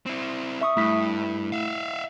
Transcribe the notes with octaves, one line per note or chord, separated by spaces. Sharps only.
C4 E4
E5 C#6 D#6
G2 A3 E4 B6
E5 F5